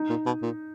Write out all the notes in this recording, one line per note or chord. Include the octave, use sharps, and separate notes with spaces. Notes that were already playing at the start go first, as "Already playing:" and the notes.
Already playing: D#4
A#2
B2
A#2